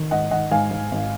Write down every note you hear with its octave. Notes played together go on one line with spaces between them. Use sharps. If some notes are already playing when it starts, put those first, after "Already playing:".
Already playing: D#3
G#2 D#5 F#5
D#3 D#5 F#5
G#2 F5 G#5
G#2
G#1